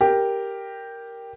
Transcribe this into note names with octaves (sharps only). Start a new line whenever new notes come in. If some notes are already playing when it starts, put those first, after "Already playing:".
G4 A#4